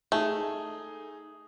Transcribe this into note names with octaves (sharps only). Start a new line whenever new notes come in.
A3 D#4 G#4